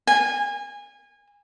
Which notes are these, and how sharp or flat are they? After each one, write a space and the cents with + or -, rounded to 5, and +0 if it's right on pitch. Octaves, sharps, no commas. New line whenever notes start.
G#5 -25